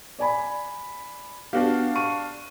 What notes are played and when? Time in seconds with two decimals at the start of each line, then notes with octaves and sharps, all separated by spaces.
0.19 D5 G#5 B5
1.53 B3 D4 F#4 G4 F5
1.96 C#6 D#7